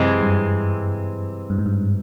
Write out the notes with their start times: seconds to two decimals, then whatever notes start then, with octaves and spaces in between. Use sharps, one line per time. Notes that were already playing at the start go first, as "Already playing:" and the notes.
Already playing: F#2 C3 E3 G#3 C4
0.22 G2
1.50 G2
1.59 G#2
1.66 G2